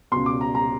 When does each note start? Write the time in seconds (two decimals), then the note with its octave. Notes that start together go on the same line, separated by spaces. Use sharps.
0.12 C#2 B2 C6
0.26 D6
0.41 A#5
0.55 A#5